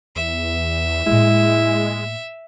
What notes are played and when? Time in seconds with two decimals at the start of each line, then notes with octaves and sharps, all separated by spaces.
0.16 E2 E5
1.06 A2 G#3 A#3 E4